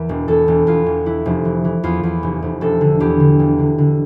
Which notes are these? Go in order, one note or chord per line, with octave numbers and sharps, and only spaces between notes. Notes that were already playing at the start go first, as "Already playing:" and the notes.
Already playing: E2 E3 A#4
E1
E2 A4
E1
E2 F4
E1
E3 E4
F1
E3
E3
E2 F4
E2
F1
F1
E1 A4
D3
E2 G4
D3
E1
D3
D3